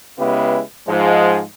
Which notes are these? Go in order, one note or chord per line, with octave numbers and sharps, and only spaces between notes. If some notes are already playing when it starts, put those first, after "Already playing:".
C#3 G#3 B3 E4 G4 B4
G#2 F3 G#3